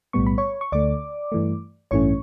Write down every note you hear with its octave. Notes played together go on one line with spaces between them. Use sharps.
B1 A2 G3 B3 C#6
B5
C#5 C#6
C#6
D2 D3 A3 D5 D6
G2 E3 A3
A1 G2 E3 A3 C#4 C#5 C#6